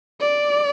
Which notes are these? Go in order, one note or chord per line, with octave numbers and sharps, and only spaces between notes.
D5